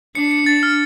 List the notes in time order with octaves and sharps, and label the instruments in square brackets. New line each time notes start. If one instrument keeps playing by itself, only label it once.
[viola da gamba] D4 [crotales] C#7
[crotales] C#7
[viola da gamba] D4 [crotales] A6
[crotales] F6